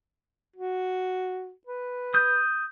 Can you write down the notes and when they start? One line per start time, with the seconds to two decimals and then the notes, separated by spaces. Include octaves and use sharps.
0.56 F#4
1.67 B4
2.14 D#6 G6